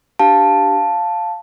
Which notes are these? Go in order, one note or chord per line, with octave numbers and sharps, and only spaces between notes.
D4 G4 F5 A5